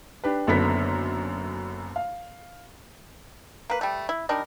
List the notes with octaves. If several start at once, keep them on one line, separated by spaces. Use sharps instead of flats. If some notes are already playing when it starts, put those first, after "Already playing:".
D4 G4 B4
F#1 F#2 D3 B3 B6
F5
A#3 B4
G3 A3
E4
G3 D4 D#4 A#4